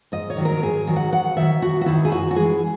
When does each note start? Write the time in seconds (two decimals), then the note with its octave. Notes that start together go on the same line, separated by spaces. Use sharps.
0.12 G#2 D#5
0.30 C#5
0.37 D#3 F#3
0.45 A#4
0.62 G#2 G#4
0.87 D#3 F#3
0.96 F#5
1.12 D#2 F#5
1.37 D#3 F#3 E5
1.62 D#2 F#4
1.81 F#4
1.86 D#3 F#3 E4
2.05 G#4
2.11 F#2 F#4
2.31 F#4
2.36 E3 G#3 G#4